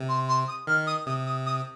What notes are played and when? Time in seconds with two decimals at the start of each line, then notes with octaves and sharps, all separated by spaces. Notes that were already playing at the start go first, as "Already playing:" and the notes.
Already playing: C3
0.09 C6
0.28 C6
0.48 D#6
0.67 D#3 F6
0.87 D#6
1.06 C3 D#6
1.26 D#6
1.46 D#6